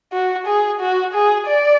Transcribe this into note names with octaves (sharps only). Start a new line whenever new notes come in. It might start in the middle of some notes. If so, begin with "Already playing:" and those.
F#4
G#4
F#4
G#4
D5